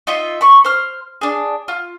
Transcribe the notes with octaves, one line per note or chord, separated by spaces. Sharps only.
D#4 F4 D#5 E5
B5 C#6
C5 F6
D4 G#4
F4